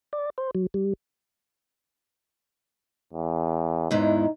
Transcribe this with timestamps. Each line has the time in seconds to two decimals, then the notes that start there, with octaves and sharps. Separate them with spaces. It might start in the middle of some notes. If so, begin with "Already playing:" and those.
0.13 D5
0.38 C5
0.55 F#3
0.74 G3
3.13 E2
3.91 E2 G#2 E3 D#4